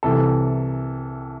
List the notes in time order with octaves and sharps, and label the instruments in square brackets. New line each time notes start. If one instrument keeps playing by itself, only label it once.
[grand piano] C2 C3 E3 A4